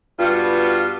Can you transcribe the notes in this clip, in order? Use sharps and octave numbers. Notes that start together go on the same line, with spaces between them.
G2 G3 B3 F4 F#4